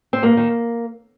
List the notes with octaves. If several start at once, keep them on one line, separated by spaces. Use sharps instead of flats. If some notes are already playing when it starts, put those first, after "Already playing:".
C4
G2 A#3
D#3